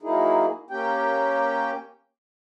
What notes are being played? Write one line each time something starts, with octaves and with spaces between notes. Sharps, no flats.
F#3 A#3 D#4 E4 G#4
A#3 C#4 G4 G5